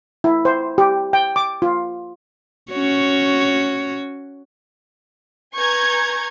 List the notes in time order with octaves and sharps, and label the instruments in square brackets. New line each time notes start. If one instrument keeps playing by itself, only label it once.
[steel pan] E4
C5
G4
G5
D6
F4
[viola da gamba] C#4 F#4 C#5
[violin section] B4 G#5 A#5 C#6 G6 G#6